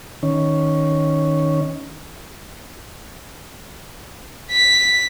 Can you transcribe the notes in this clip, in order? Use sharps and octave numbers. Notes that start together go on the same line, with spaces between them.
D#3 C#4
B6